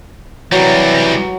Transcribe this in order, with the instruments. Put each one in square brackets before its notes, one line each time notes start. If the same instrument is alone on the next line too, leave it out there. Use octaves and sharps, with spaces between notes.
[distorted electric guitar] C3 G3 [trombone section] E3 [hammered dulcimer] F#3